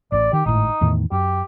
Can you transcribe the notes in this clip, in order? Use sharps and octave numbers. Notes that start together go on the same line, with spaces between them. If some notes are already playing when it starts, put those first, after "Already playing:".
A1 A2 D5
D#3 G4
G#1 A2 D#4
E2 A2 D#3
F#2 G4